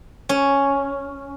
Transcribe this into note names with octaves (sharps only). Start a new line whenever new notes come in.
C#4